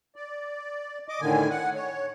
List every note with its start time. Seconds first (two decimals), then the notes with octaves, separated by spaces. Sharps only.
0.16 D5
1.08 D#5 D6
1.21 A2 D3 D#3 G#5
1.50 F#5
1.75 C#5